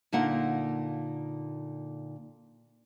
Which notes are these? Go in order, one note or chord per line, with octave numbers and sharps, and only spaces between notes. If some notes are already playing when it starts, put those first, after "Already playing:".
A#2 D3 A#3 D#4 F4 F#5